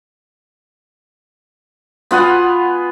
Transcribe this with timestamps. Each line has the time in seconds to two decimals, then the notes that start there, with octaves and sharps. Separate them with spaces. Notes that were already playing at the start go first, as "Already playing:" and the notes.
2.11 B3 F4 F#5 G#5